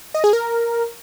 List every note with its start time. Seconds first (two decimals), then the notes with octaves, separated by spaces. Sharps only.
0.14 D#5
0.24 G#4
0.33 A#4